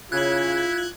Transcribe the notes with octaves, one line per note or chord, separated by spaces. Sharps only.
C#3 E4 F4 F#6 G#6